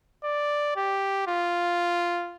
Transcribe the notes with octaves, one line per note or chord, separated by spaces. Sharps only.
D5
G4
F4